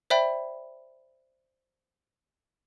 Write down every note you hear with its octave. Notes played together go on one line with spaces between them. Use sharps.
C5 D5 E5 G5 B5